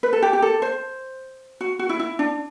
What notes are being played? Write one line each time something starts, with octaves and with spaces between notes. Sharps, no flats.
B4
A4
G4
G4
A4
C5
F#4
F#4
E4
E4
D4